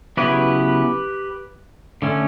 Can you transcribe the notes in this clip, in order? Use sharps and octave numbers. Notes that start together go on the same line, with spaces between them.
C#3 F#3 B3 E4 G4 B4
D3 A3 C#4